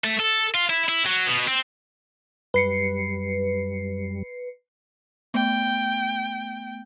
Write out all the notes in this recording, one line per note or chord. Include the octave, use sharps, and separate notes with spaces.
A3
A4
F4
E4
E4
F#3
B2
C4
F#2 G3 B4 C7 C#7
A3 B3 G5